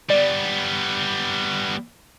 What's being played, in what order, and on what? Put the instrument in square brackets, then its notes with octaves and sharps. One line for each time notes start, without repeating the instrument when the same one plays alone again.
[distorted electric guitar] G3 B3 [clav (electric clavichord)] D5